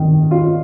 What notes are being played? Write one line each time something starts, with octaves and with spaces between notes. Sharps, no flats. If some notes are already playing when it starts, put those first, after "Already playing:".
Already playing: D#3
F4